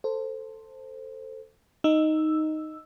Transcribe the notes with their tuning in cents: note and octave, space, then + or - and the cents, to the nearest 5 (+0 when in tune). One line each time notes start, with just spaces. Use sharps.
A4 +15 C5 +0
D#4 +0 E6 +0